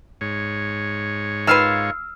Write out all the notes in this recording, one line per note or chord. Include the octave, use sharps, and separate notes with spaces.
G#2 C#5
D#3 F4 B4 E6 F6 C7